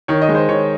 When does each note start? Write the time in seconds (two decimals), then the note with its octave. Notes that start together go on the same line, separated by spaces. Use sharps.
0.08 D#3 C#5
0.22 D#5
0.29 G#3
0.35 C5
0.49 D#3 C#5